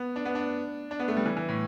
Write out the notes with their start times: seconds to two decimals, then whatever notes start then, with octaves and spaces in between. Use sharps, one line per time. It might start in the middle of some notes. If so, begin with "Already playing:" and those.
Already playing: B3
0.16 D4
0.25 B3
0.35 D4
0.91 D4
1.00 B3
1.08 A3
1.16 G3
1.26 E3
1.37 E3
1.49 A2